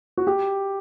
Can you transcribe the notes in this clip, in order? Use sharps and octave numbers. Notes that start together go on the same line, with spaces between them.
F#4
G4